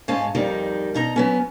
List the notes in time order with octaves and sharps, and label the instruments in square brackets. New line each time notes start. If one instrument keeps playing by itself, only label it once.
[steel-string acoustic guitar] G#2 G#3 C#4 F5 A5
F2 D#3 G3 D#4
B2 D#4 A#5
F#3 B3 C#4